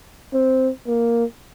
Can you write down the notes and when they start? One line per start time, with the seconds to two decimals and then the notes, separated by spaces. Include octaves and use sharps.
0.33 C4
0.87 A#3